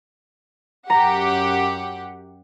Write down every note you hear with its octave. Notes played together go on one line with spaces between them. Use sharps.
F#2 G4 F#5 A#5